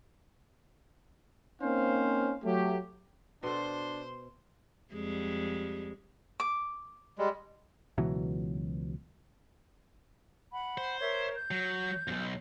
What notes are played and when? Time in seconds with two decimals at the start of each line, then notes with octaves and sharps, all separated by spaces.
1.62 A#3 C4 C#4 D#4 C5 F5
2.44 F#3 A3 G4
3.43 B2 D4 A4 C5 C6
4.94 F2 G3 G#3
6.40 D6
7.18 G3 G#3
7.98 C#2 B2 E3 F#3
10.53 F#5 B5
10.78 C5
11.01 A#4 C#5 E5
11.36 G6
11.51 F#3
12.08 B1 F2